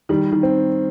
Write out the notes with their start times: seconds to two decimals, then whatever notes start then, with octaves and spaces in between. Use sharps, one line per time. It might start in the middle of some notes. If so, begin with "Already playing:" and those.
0.09 D#3 G3
0.32 D#3 G3
0.43 C4